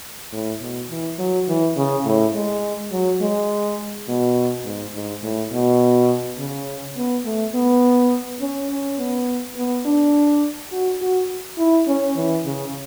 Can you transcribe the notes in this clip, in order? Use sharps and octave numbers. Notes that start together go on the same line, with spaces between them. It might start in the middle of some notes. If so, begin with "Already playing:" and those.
A2
B2
E3
F#3
E3
C#3
A2
G#3
F#3
G#3
B2
G#2
G#2
A2
B2
C#3
B3
A3
B3
C#4
C#4
B3
B3
D4
F#4
F#4
E4
C#4
E3
C#3